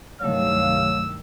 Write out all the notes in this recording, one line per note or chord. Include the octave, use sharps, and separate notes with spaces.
C2 G2 D#3 F#3 A3 C#5 F5 E6